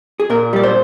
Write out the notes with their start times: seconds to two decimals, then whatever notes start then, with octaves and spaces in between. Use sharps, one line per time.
0.20 G#4
0.30 A#2 A#4
0.53 G3 D5
0.63 C5